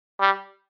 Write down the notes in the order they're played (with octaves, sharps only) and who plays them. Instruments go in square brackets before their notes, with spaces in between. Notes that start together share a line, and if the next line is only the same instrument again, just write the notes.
[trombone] G3